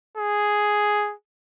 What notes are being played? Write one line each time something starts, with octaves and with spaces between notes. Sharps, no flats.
G#4